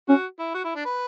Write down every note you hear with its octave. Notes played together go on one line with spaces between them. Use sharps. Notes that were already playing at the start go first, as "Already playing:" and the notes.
C#4 F#4
E4
F#4
E4
D4
B4